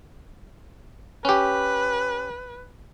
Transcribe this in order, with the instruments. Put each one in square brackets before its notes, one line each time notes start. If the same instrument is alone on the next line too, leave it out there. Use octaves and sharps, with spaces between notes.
[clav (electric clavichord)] C#4 G4 [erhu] B4